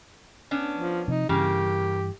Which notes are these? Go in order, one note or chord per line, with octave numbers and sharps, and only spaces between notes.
B3 C#4 D4
F3
C3 F3 D#4
G2 C#3 E3 A#3 G4